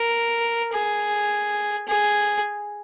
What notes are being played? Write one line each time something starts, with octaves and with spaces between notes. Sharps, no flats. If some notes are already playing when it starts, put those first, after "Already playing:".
Already playing: A#4
G#4
G#4